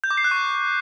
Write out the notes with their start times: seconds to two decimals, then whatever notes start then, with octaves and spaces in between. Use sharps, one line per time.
0.04 G6
0.11 D6
0.17 C7
0.24 F#6
0.31 C#6